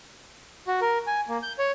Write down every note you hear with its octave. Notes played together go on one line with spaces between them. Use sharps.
F#4
A#4
G#5
A#3
G6
C#5